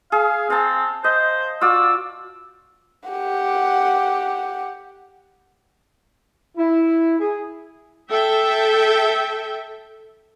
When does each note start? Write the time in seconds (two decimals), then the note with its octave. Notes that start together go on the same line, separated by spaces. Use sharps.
0.12 G#4 F5
0.50 C4 F5 A5
1.04 C5 D#5
1.61 F4 F#4 D5 E6
3.09 G4 F#5
6.57 E4
7.20 G#4
8.09 A4 E5 G5